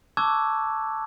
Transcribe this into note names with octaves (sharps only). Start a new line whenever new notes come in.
A5 C#6 D6 E6 F#6 G#6